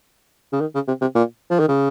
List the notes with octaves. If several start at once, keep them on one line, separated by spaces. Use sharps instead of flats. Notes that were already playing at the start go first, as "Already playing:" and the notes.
C#3
D#3
C#3
C3
C3
A#2
F3
D#3
C#3